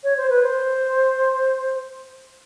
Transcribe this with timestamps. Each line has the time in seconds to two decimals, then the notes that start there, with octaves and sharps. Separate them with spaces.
0.04 C#5
0.17 C5
0.30 B4
0.43 C5